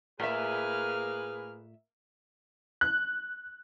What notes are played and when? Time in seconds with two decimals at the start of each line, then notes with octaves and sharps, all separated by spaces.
0.20 A2 A#3 G#4 B4 E5 F6
2.81 F#6